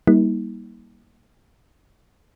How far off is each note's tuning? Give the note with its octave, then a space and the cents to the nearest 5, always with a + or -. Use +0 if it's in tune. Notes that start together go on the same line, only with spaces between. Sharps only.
G3 +0 A#3 +20 D#4 +45